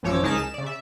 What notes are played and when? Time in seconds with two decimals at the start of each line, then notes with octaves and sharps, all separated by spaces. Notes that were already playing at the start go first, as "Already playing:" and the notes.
0.03 A1 F#2 F3 C#5 D6 E6
0.22 C#2 D#4 G#4 A#4 A5 B6
0.38 E7
0.54 C#3 D5
0.66 E5